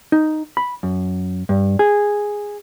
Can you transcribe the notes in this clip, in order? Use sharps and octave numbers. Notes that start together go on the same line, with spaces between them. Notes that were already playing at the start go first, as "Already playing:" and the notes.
D#4
B5
F#2
G2
G#4